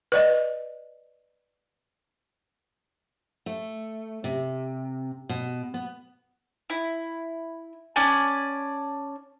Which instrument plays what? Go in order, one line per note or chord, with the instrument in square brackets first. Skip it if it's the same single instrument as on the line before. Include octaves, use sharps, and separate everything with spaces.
[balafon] B4 D5 D#5
[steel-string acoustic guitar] A3
C3
B2
B3
[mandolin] E4
C#4 D5 G#5 A5